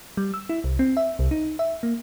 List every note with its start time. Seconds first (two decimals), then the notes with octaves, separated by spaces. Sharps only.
0.17 G3
0.34 E6
0.49 E4
0.64 C2
0.79 C4
0.97 E5
1.19 C2
1.31 D#4
1.59 E5
1.83 A#3